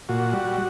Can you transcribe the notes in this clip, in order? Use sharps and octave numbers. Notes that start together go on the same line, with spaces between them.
A#2 F#4
G3